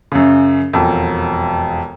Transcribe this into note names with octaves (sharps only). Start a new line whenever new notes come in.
F#2 C#3
E1 F2